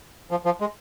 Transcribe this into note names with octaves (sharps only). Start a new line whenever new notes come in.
F3
F3
G#3